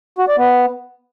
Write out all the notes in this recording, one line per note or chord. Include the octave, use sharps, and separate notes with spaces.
F#4
D5
B3